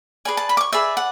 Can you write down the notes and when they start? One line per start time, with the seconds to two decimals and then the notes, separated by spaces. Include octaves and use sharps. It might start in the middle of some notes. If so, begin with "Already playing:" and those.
0.25 G#4 B4 D5 G#5
0.37 A5
0.49 B5
0.57 D6
0.61 C#6
0.73 G#4 B4 D5 E5
0.97 F#5